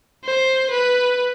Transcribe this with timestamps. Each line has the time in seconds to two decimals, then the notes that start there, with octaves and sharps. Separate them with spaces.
0.24 C5
0.71 B4